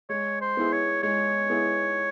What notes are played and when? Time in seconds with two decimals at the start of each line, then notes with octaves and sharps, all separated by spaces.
0.10 G#3 C#5
0.42 C5
0.57 B3 E4 G#4
0.72 C#5
1.03 G#3 C#5
1.50 B3 E4 G#4